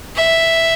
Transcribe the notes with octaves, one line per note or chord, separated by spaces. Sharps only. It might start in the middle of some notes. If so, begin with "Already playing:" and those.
E5